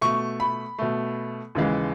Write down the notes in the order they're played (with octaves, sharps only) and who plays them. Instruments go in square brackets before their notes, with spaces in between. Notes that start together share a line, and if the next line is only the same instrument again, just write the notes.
[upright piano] B2 A3 C#6
B5
B2 A3
D#2 C#3 E3 G#3